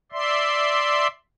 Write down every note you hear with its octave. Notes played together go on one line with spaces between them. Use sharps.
D5 E5 C6